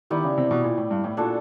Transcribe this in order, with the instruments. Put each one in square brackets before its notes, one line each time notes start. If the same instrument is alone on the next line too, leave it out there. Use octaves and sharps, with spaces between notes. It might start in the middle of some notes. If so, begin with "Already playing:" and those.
[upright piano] D#3 [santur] G3 B3 E4 G4
[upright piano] C#3
C3
B2
A#2
A2
G2
A2
[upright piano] A#2 [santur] D4 F#4 A4